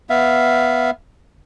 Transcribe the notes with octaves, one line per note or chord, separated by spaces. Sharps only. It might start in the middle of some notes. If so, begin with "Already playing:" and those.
B3 E5 F5